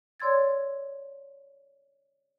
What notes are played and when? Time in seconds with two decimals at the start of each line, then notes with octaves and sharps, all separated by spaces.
0.20 C#5 D5 C6 E6 G#6 A6